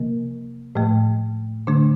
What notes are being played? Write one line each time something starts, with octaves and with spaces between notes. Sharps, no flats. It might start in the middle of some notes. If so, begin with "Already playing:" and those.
Already playing: C3 F3 A#3
A2 F3 A3
D3 A3 D4